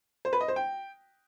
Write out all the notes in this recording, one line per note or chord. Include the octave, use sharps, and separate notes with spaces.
C5
B4
D#5
C5
G5